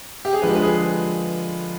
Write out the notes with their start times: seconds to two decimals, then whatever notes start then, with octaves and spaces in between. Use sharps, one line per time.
0.25 G4
0.33 G#4
0.42 D3 F3 G#3 B4
0.55 B4
0.62 G#4